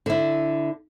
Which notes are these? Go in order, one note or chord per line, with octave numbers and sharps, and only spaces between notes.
D3 E4